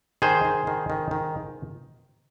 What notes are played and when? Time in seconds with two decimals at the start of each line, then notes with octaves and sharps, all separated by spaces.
0.22 D#3 G#4 C5
0.45 D#3
0.67 D#3
0.90 D#3
1.11 D#3